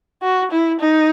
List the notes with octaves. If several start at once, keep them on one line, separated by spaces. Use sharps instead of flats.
F#4
E4
D#4